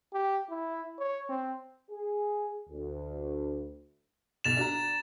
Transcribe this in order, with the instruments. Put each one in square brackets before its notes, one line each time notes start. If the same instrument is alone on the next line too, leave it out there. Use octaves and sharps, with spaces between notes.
[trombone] G4
E4
C#5
C4
[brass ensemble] G#4
D2
[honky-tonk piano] B1 F7 [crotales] A6 E7
[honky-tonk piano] D4 F#4 A#5